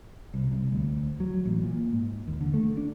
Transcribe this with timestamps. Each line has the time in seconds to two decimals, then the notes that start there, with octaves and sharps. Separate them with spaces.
0.34 C2
0.52 C2
0.72 D2
1.20 F#3
1.45 A1
1.63 A#2
1.92 G#2
2.27 D#2
2.41 D3
2.54 A3
2.77 D4